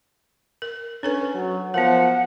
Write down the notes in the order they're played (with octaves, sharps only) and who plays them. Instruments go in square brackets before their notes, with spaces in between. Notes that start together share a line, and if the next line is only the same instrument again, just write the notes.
[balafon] A#4
[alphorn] C#4 [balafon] D4 A4 B4
[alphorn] F#3
[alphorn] F3 [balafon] B3 A#4 [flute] F#5